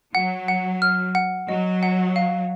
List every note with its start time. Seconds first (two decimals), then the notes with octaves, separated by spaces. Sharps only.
0.15 F#3 F#5
0.48 F#5
0.82 F6
1.15 F#5
1.48 F#3 D#5
1.83 F#5
2.16 F5